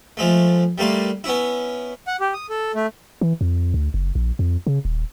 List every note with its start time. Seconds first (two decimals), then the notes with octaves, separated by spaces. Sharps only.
0.17 F3 G#3 A3
0.78 G3 A3 A#3 C6
1.24 B3 C#4 E4
2.07 F#5
2.21 G4
2.34 D#6
2.50 A4
2.75 A3
3.21 E3
3.41 F2
3.74 D2
3.94 F#1
4.15 A#1
4.39 F2
4.67 C#3
4.85 D#1